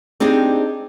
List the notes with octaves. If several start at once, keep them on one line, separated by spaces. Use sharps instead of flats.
C4 D4 D#4 G4 G#4